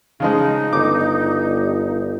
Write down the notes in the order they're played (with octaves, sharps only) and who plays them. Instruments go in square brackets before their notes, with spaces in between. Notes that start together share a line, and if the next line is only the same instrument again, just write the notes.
[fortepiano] C#3 F3 G#3 [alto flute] D#4
[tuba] G1 [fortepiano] D6